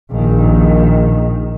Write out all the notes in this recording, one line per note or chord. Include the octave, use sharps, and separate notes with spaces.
A#1 D#3